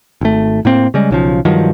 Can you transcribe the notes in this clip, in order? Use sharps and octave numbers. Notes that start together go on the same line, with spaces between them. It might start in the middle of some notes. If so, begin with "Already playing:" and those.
G#1 A3
A2 A#3 C4
C#3 G3 G#3
B1 C#3 F3
G2 D#3 F3 F#3